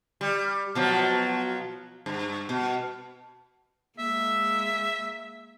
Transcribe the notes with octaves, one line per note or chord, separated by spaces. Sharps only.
G3
B2 F3 F#3
G2
B2
G#3 A#3 E5